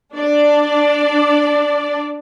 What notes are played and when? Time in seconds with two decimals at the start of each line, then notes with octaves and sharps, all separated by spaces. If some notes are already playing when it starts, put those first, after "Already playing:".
0.15 D4 D5